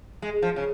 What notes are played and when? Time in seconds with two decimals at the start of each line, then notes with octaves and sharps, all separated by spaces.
0.22 G#3
0.42 F3
0.56 C#3